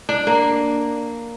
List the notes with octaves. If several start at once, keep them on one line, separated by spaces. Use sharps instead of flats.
D4
A#3